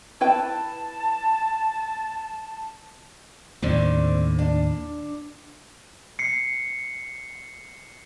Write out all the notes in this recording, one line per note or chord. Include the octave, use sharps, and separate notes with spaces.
E4 B4 G5 A5
D#2 A2 D3 C4 C5 D5
D4
C7 C#7